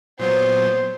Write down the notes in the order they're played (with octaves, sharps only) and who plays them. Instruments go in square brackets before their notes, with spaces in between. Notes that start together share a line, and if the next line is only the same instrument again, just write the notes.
[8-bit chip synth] A#2 F#3 B3 [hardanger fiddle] C5